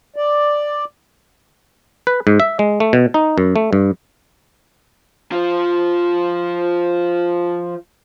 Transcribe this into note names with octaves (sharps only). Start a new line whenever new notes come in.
D5
B4
G#2
E5
G#3
A3
B2
D#4
F#2
A3
G2
F3 F4